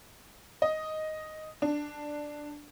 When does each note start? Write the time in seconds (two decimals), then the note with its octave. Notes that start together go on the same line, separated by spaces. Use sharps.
0.62 D#5
1.62 D4